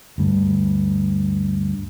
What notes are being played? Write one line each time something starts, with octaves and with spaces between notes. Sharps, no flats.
D2 G2